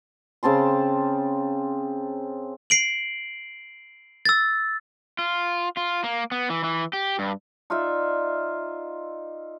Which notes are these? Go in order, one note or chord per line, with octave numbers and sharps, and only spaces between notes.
C#3 C4 A5 C6
C7 D7 F#7
E6 A6
F4
F4
A#3
B3
E3
E3
G4
G2
D#4 F4 D5 E5